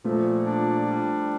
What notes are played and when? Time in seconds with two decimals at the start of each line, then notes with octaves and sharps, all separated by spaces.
0.04 A#2 F3 A3
0.45 D4
0.87 G3